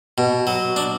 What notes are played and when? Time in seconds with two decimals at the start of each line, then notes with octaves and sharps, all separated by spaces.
0.18 B2
0.47 F#3
0.76 D4